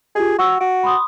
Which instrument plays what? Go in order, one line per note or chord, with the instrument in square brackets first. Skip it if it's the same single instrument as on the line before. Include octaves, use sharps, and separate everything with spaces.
[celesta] F4 G4 [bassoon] G#4
[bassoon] F#4 [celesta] C#6 E6
[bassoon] F#4 [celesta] D7
[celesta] B5 C6 D#6